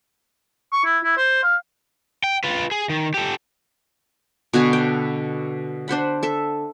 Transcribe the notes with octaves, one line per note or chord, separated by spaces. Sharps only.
C#6
E4
E4
C5
F5
G5
F4 B4
G#4
D#3
G4 A4
B2 D3 F#4 G#5
G5
D4 C5 F#5 B5
A4 E5